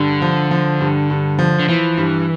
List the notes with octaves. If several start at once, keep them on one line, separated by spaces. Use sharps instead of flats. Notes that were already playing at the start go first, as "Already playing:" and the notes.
Already playing: G2 D3
F3
F3
G2
G2
F3
D3
E3 F3
G2